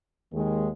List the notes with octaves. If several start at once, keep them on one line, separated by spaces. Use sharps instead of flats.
D#2 D#3 G#3